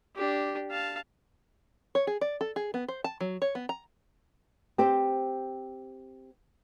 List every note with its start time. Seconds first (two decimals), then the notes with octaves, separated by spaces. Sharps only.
0.16 D4 G4
0.71 F5 A5
1.95 C#5
2.07 G#4
2.21 D5
2.41 A4
2.56 G#4
2.74 B3
2.88 C5
3.04 A5
3.21 F#3
3.42 C#5
3.55 B3
3.69 A#5
4.78 C4 G4 C5